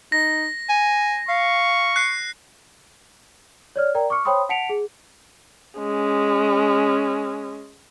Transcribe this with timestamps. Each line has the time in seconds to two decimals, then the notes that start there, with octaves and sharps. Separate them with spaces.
0.12 D#4 A#6
0.69 G#5
1.29 F5 C#6
1.96 F#6 C7
3.76 C#5 D5 F6
3.95 A#4 D5 G5 A#5
4.10 C#6 D6 F6 C#7
4.25 C5 C#5 G5 B5 C6 D#6
4.49 F#5 A5 B6 C#7 D7 F7
4.69 G#4
5.79 G#3 C#4